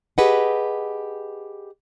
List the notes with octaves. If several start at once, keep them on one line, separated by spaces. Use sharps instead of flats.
G4 G#4 B4 D#5 F#5